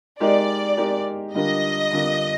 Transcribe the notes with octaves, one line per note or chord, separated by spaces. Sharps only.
G#3 D#4 G4 A#4 D5
G#3 D#4 G4 A#4
D3 G3 D4 F4 A#4 D#5
D3 G3 D4 F4 A#4